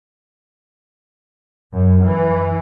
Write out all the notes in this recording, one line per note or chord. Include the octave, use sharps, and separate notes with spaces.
F#2
E3